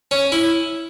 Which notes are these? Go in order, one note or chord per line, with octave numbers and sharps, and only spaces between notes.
C#4
E4